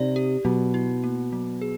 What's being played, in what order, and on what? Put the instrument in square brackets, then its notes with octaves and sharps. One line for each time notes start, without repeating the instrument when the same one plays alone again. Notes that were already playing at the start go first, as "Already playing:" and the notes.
Already playing: [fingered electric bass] C3 [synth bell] D#4 D5
[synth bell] G4
[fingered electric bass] B2 [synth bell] F#3
[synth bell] E4
A#3
F#3
G#4